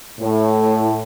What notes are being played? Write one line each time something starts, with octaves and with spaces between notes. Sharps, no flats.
A2